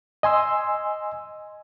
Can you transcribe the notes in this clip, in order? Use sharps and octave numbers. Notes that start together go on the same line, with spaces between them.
D#5 G#5 C6 E6